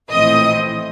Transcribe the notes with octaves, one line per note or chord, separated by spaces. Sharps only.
A#1 A2 E3 A3 C4 D#5 D#6